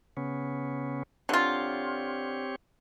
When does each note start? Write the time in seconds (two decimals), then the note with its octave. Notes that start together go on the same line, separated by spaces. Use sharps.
0.17 C#3 B3 C#4
1.29 D3 C4 F4 G4 C#5